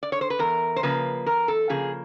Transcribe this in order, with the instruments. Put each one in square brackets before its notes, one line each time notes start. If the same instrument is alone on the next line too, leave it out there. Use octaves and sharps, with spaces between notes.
[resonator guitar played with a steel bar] D5
C#5
C5
B4
E2 A#4
C5
C#3 F3 A#3 B4
E2 A#4
A4
C#3 F3 A#3 G#4